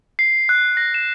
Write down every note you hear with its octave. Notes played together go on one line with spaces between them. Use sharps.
C7
F#6
A#6
E7